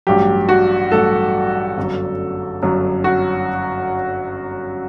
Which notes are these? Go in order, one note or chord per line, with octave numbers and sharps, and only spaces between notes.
A1 G2 F#3 G4
F#4
A1 G2 F#3 A4
G1 F#2 F#3
G1 F#2 F#3
F#4